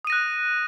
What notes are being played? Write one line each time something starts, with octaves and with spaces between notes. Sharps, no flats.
D#6 F#6 A#6 D#7